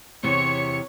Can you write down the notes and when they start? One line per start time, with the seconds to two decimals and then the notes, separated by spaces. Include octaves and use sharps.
0.23 E2 C3 C#5 C#7